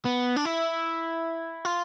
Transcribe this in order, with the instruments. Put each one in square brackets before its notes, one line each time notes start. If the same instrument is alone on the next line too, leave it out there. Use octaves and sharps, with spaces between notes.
[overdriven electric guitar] B3
D4
E4
F4